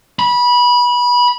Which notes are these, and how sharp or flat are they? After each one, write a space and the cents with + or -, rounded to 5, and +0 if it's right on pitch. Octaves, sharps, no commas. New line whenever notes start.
B5 -20